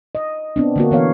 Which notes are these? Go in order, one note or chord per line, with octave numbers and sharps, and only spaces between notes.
D#5
B3 C4 D4
D3 A#3 F#4
E3 B3 C#5 F5